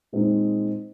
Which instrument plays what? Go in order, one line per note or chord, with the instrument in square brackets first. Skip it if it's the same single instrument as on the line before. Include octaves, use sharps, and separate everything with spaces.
[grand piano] A#2 G#3 C4 D#4